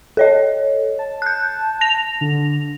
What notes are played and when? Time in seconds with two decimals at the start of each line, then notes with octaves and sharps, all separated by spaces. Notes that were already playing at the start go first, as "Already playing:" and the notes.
0.17 A4 C#5 D#5
0.99 A5
1.22 F#6 G6
1.81 A#6 F7
2.21 D3